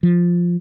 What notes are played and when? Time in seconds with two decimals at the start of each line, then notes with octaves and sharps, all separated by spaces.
0.03 F3